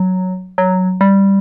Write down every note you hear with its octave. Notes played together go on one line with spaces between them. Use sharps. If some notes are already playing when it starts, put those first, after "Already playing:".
Already playing: F#3
F#3
G3